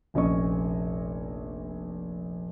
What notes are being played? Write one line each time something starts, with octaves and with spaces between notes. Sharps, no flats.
F1 A#1 C#4 D#5 C#6